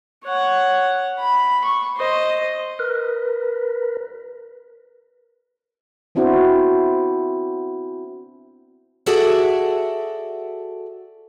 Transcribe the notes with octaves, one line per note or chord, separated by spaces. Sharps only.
C#5 F#5
B5
C#6
C5 D#5
A#4 B4
B3 C4 D4 E4 F#4 C5
F#4 G#4 A4 D5 E5 F#5